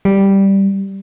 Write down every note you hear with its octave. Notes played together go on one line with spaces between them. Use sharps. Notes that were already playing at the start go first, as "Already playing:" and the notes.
G3